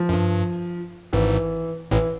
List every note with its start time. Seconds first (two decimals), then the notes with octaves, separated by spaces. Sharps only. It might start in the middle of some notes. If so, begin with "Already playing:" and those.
Already playing: F3
0.09 F#2
0.13 G2
1.13 G#1 G#2 E3
1.91 A1 A2 E3